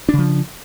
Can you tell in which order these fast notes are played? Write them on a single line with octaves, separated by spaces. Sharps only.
D4 C#3 F3